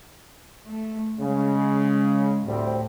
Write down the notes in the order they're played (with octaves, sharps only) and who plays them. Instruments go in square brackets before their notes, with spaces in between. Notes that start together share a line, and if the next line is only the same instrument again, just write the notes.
[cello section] A3
[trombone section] C#3 [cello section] G#3
[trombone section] D2 G3 C4 [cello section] A2